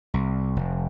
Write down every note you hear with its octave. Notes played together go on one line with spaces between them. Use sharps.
C2
F1